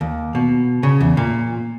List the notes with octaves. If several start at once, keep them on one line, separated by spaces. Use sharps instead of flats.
D#2
B2
C#3
E2
A#2